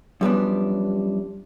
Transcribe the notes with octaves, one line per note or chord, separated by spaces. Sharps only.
F#2 F3 G3 G#3 B3 D4